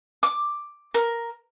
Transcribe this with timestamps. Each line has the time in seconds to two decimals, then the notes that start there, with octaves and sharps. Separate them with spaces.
0.23 D6
0.94 A#4